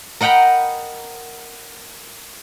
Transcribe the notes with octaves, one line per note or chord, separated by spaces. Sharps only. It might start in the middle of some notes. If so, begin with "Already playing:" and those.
A#4 D#5 F#5 G5 A#5 B5